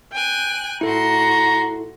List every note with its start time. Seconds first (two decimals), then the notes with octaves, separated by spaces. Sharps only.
0.13 G5 G#5 F#6
0.81 A2 E4 F#4 A4 A#5 C6